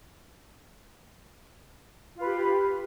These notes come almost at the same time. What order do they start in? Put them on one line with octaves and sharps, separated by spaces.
F4 B4 G4